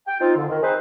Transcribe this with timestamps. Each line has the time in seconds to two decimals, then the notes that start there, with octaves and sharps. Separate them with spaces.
0.08 G5
0.21 C4 D#4 F4
0.37 F2 D3
0.50 D#3
0.63 C4 D#4 G#4 B4 C5